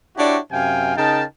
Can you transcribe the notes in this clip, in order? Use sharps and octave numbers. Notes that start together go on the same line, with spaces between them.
D4 E4 F#4 G4 C#5 D5
F#2 C3 F5 G5 G#5
C#3 D#4 A#4 G5 A5